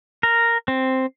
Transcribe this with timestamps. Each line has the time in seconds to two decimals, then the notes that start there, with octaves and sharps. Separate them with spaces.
0.23 A#4
0.68 C4